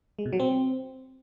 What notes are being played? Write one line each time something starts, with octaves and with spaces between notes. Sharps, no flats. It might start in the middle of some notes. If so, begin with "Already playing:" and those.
G#3
B2
F#3
C4